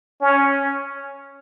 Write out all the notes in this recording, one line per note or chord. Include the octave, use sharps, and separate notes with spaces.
C#4